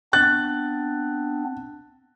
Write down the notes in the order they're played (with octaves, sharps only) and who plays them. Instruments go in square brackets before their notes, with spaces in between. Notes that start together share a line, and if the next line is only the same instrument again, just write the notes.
[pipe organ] B3 C4 D4 [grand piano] F#6 A6